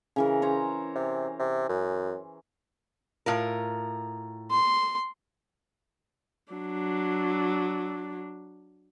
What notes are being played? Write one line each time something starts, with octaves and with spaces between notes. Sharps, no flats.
C#3 E3 A#4
C5 C#5 A#5
C3
C3
F#2
A2 F4 A#4
C6
F#3 D4